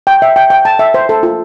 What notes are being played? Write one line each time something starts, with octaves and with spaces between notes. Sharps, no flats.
G5
E5
G5
G5
A5
E5
C5
A4
F4